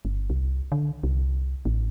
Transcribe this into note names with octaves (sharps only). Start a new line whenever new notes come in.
G1
C2
D3
C2
A1